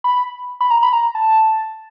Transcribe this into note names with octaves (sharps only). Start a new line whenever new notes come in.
B5
B5
A#5
B5
A#5
A5